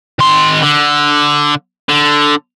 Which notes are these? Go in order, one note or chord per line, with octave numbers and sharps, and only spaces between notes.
D#3 C6
D3
D3